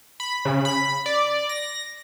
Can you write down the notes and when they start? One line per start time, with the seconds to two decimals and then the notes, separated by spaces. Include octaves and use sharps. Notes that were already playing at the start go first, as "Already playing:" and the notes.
0.20 B5
0.45 C#3
0.65 B5
1.06 D5
1.49 A#6